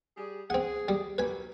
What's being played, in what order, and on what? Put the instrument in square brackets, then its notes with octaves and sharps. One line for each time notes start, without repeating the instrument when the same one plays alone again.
[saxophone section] G3 G#4
[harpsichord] C4 F#5 [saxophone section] G#4
[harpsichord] G3
[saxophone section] D#3 F#3 G3 [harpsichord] B4 G#5